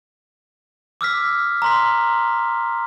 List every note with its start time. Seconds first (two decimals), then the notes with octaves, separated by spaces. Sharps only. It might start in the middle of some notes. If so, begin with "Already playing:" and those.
1.01 D6 E6 F6 B6
1.62 A#5 C6 B6